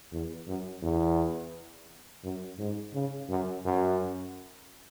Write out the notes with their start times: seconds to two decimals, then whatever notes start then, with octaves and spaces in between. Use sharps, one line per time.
0.12 E2
0.47 F#2
0.83 E2
2.24 F#2
2.59 G#2
2.94 C#3
3.29 F#2
3.65 F#2